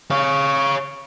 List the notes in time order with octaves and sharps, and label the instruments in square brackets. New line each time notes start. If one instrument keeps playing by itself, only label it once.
[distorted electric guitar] C#5 F5